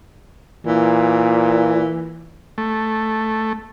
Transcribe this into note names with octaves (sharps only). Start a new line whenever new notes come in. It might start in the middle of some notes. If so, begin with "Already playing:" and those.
A#2 E3
A3